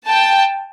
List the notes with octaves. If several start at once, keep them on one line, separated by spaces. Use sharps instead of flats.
G5 A5